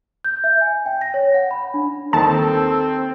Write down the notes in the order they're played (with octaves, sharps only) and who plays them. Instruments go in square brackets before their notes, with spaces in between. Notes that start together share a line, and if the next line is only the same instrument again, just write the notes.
[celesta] G6
E5
G#5
G5
A#6
C#5
F#5
B5
D4
[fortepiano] D#2 D#3 [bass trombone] C4 [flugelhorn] A4 [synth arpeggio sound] A5